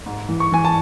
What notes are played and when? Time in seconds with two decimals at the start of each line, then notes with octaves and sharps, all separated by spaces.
0.06 G#2
0.29 E3
0.40 C#6
0.52 E3 G#5
0.65 A5